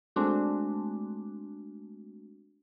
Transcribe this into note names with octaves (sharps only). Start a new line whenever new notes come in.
G#3 A3 C4 D4 F#4